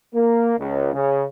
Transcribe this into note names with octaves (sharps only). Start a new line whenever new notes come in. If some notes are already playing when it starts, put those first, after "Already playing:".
A#3
C#2
C#3